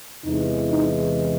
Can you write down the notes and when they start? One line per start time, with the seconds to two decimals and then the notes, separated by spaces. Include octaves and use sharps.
0.25 E2 C3 E3 G#3 D#4
0.70 D#4